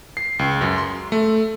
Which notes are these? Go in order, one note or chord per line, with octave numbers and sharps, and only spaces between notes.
C7
C#2
F#2
C6
A3